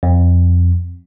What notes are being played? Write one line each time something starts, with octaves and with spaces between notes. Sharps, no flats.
F2